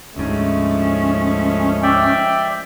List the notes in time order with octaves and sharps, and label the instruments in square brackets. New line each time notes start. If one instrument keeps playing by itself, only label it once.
[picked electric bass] D2 G#2 [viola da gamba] F3 G#3 A3 [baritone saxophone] C#4
[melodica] D5 E5 G5